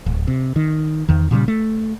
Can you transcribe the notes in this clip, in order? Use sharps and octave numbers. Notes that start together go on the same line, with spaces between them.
D1
C3
D#3
E2 D#3
A#2 C#3 E3 G3
A3